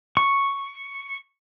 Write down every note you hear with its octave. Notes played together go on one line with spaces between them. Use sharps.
C#6